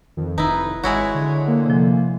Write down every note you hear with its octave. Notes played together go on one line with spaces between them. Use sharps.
F2 D#3
F1 D#4 E4 B4 A#5
G#1 G#3 E4 F#4 C#5
D3 C#5
A#3
C3 F3